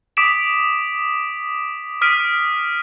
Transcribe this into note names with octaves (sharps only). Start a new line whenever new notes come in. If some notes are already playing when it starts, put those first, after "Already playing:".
D6 D#6 B6 D7 E7
D#6 F6 B6 D7 D#7